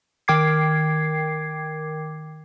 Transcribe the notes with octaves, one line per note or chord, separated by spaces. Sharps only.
D#3 A#4 G5 D6 G#6 C7